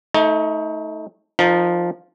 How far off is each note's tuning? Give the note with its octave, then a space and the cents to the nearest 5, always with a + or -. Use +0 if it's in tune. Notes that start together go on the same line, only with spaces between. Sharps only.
A3 +0 D#4 +30
F3 +0 D#4 -30 A#4 +0